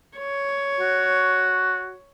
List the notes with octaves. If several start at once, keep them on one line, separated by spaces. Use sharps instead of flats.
C#5
F#4